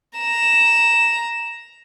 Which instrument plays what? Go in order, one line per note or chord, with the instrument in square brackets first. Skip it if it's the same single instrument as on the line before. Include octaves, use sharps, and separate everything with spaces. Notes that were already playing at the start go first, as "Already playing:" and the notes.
[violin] A#5 E7